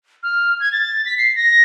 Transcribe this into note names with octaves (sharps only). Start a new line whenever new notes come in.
F6
G#6
A6
B6
C7
A#6